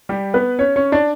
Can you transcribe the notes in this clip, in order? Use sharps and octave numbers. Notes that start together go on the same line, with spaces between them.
G3 G4
B3 B4
C#4 C#5
C#4 C#5
D4 D5